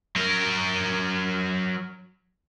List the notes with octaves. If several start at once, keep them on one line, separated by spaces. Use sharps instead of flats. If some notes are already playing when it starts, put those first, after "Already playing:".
F#3 A#4